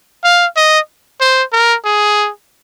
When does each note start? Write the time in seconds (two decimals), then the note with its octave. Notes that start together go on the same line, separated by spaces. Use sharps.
0.24 F5
0.57 D#5
1.21 C5
1.53 A#4
1.85 G#4